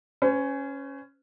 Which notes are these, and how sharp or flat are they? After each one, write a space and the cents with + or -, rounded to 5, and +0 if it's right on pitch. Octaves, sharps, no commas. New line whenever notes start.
C#4 +0 C5 -45